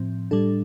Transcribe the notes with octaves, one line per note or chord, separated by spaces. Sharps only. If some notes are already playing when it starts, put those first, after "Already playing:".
Already playing: A2 F3 C4
A2 G3 D4 A4